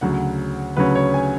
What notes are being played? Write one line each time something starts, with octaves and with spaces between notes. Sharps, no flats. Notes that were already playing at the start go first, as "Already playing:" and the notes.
D2 C#3 F#3 C#4 F#5
D2 C#3 F#3 C#4 B4
C#5
G#5